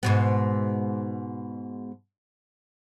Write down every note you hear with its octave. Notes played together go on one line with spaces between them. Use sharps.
G#2 B2 B3